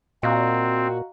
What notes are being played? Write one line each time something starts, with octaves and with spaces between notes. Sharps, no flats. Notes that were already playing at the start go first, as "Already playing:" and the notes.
A#2 C4 F#4 D#5 F5 A#5